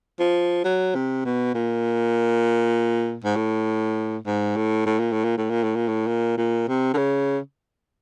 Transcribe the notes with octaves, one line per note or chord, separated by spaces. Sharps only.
F3
F#3
C3
B2
A#2
G#2
A2
G#2
A2
A2
A#2
A2
A#2
A2
A#2
A2
A#2
A2
A#2
A#2
C3
D3
C#3